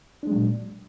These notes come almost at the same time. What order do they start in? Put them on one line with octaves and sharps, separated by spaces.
D4 G#3 F#3 A#2